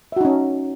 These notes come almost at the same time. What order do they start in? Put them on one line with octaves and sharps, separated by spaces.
E5 F#4 D#4 C#4